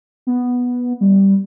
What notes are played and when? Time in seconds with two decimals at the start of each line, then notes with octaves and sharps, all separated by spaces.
0.27 B3
1.01 G3